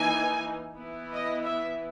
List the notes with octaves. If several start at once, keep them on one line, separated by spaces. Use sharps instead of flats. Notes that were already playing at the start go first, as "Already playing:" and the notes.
Already playing: E3 A#3 D#4 G#5
E3 B3 E4
D#5
E5